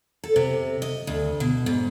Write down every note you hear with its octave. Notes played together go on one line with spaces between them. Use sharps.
A4
C3
D#5
D2
B2
G#2